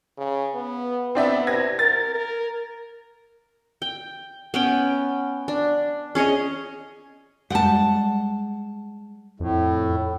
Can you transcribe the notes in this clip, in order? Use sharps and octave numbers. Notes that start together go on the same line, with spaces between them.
C#3
B3
B3 C4 D4 E5
C3 G#6 A#6
A#4 A6
A#4
G5
B3 C#4 G5
D4
C#4 G#4 C#5 D#5
G3 G#3 F#5 G5 A5
F2 A2